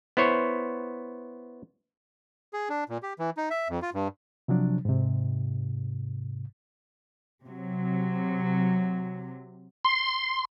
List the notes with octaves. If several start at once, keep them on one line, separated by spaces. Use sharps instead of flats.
B3 E4 C5 C#5
G#4
D4
A#2
G4
E3
D#4
E5
F2
F4
G2
C3 F3 F#3 D4
G#2 C3
C3 F#3
C6